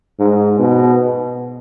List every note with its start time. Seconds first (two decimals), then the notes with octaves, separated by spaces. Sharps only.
0.19 G#2
0.59 B2